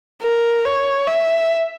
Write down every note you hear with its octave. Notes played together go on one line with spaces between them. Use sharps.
A#4
C#5
E5